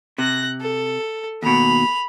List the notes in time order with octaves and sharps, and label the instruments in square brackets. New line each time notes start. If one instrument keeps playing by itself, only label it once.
[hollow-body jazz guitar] C3 [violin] F#6 A#6
[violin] A4
[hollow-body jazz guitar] D#2 B2 [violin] B5 F7